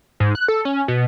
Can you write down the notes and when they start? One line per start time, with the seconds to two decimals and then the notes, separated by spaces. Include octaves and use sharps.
0.20 G#2
0.35 F#6
0.48 A4
0.65 C#4
0.88 B2